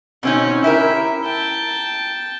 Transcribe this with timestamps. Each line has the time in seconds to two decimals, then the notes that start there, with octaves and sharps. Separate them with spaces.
0.23 B2 C4 C#4 D#4
0.64 E4 G4 A#4 E5
1.24 G5 A5